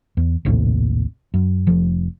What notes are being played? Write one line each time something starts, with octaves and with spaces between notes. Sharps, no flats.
E2
A#1 D#2 A2 C3
F#2
F1 F3